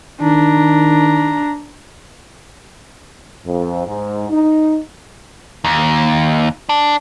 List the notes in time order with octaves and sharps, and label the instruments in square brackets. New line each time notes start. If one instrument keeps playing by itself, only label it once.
[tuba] D#3 [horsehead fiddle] D4 A#5
[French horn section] F2
G#2
D#4
[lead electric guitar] D#2
D4